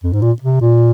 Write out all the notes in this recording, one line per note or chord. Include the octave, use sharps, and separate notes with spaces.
F2
G#2
A#2
C3
A#2